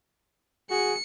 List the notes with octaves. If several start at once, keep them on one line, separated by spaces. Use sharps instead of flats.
F#4 G#4 C#7